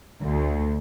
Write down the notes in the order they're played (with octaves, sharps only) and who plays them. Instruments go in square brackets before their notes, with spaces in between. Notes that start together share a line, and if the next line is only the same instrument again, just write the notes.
[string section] D2